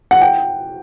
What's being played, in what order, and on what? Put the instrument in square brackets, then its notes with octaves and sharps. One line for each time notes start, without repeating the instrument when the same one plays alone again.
[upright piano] F#5
G5